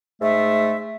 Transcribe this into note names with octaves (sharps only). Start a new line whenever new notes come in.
G#2 A3 E5